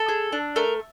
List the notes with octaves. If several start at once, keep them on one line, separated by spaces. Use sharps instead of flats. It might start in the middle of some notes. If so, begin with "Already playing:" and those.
Already playing: A4
G#4
D4
A3 A#4